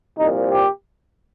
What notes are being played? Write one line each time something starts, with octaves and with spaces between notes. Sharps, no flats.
C2 A#2 F3 D#4
G4